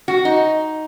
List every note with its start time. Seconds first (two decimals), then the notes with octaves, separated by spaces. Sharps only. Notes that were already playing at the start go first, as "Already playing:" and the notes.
0.08 F#4
0.25 D#4